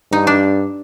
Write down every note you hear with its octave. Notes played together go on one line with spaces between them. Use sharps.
G2 D#4
D4